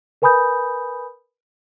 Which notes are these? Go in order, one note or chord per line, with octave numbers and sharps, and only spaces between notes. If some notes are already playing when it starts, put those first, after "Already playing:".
A#4 B4 G#5 B5 D#6 G6